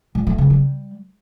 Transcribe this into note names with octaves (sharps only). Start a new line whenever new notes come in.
A#2
A3
C#3
G3